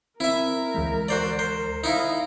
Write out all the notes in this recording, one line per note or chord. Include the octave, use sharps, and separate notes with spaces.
C4 E4 A#4 E5
D2 E3 G#3
F#4 C5 D5
C5
D#4 E4 D#5 F5